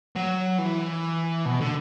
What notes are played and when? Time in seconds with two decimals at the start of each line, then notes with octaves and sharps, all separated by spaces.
0.16 F#3
0.58 E3
1.45 B2
1.60 D3